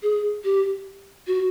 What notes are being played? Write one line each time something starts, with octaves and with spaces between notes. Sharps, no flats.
G#4
G4
F#4